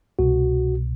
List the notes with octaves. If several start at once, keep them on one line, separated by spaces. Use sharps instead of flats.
C2 B2 F#4